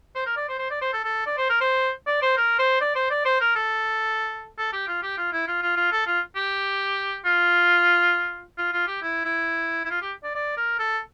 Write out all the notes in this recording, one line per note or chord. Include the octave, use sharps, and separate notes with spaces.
C5
A#4
D5
C5
C5
D5
C5
A4
A4
D5
C5
A#4
C5
D5
C5
A#4
C5
D5
C5
D5
C5
A#4
A4
A4
G4
F4
G4
F4
E4
F4
F4
F4
A4
F4
G4
F4
F4
F4
G4
E4
E4
E4
F4
G4
D5
D5
A#4
A4